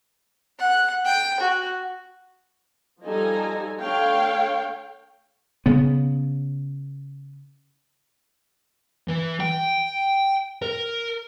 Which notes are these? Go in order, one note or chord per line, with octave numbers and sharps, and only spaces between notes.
F#5
G5
F#4
F3 G3 D#4 A4 G#5 A#5
D3 A3 A4 C#5 F5 G5
C#3 B3
E3
G5
A#4